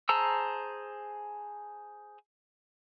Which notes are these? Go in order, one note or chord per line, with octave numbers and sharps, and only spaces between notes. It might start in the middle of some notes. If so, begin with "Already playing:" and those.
G#4 C5 A5 A#5 E6